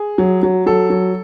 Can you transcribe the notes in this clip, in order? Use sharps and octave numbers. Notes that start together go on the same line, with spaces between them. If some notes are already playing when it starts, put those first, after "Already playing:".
Already playing: G#4
F#3
F#3
F#3 A4
F#3